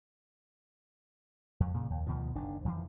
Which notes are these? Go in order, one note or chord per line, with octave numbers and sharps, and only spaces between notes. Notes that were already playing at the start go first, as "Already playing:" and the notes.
F2
A#2 C#3
D#2
D2 B2 D#3 F3
F#1 D#3 D4
F2 D#3 E3